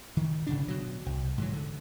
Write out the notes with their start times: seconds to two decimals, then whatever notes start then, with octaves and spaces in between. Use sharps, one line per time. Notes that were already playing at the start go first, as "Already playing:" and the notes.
0.17 D#3
0.47 G#1 C#3 D4
0.68 B2 F#3
1.06 C2
1.38 G#2 E3 F#3
1.53 D3